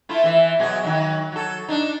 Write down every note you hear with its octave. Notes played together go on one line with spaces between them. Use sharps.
A3 E4 F4
E3 E5
B2 F#3 G#4
D#3 F#3
F#3 A4
D4 D#4